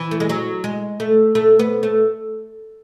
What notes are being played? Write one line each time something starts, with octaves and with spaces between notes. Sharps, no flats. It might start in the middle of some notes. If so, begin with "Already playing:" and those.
Already playing: E3
A3
G#3
F#3
G#3
A3
A3
B3
A3